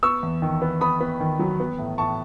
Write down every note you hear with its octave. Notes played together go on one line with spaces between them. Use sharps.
B3 C#6 E6
E2
D#3
B3
B3 B5 D#6
B3
D#3
F#3
B3
A2
A2 A5 C#6